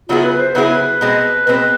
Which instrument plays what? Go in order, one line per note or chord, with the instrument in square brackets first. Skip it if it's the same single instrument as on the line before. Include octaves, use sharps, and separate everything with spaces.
[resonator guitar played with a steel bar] C#3 F#3 B3 E4 G#4 [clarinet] F4
[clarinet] B4
C5
[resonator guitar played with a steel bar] C#3 F#3 B3 E4 G#4 [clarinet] B4
[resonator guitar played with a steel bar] B2 G#3 C4
[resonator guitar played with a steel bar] B2 G#3 C4 [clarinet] B4